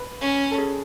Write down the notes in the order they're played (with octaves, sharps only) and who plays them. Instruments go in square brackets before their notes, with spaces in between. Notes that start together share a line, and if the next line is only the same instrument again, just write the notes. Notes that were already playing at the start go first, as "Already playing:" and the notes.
Already playing: [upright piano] B4
[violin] C#4
[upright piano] A4
G#4